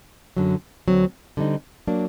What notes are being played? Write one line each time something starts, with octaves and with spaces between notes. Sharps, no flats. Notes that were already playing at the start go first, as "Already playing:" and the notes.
F#2 D3 F#3
D2 D3 F#3 C4
D3 G3 C4 D#4
F#3 A#3 D4